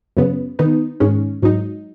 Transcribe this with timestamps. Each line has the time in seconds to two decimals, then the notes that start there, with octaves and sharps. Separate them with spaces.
0.17 F#2 C#3 B3
0.59 D#3 B3 D#4
1.00 G#2 D#3 G#3 C#4
1.43 G#2 F#3 D#4